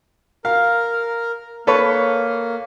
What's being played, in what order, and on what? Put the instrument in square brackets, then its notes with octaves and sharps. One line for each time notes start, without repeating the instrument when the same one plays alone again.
[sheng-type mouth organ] A#4 [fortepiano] F5
[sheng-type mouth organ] A#3 [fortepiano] A4 B4 C#5